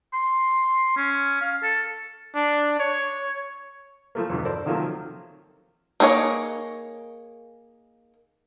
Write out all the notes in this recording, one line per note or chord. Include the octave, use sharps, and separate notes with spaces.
C6
C#4
F5
A4
D4
C#5
F3 A3 A#3
E2 G2 B2
A4 A#4 C5 D5
C3 D#3 F3 F#3 A3 A#3
A#3 D#4 G#4 C#5